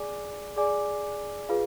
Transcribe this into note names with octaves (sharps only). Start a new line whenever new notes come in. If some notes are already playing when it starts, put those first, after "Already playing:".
Already playing: G#4 D5 G#5 D6
G#4 D5 G#5 D6
F4 G#4 B4 F5